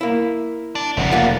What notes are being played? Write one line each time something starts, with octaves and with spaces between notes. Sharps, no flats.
A#3 E4
D4
F1 A3 B3
A#3 F4 F#5